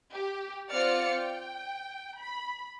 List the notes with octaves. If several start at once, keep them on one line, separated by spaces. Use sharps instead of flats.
G4
C4 F4 D5 F#5 F6 C#7
G5
B5